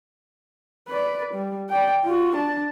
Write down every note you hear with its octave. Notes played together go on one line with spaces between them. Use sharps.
B4 D5
G3
D5 G5
F4 F#4
D4 A5